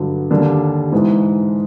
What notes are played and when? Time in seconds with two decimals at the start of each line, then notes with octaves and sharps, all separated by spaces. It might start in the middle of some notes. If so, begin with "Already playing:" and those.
Already playing: G2 D3 F#3
0.30 D#2 D3 G3 A#3 D4
0.92 G#2 E3 G#3